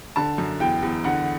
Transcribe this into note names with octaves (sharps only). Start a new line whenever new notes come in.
D3 A5
F#2
E2 G5
E2
D3 F#5